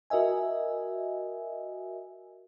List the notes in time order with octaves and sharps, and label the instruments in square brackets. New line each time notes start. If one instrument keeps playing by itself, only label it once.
[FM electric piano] F#4 A#4 D#5 E5 G#5